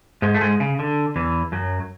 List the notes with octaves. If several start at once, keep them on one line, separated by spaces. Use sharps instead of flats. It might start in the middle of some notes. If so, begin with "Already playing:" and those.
G#2 G#3
A3
G#2 G#3
C#3
D3
E2 E3
F#2 F#3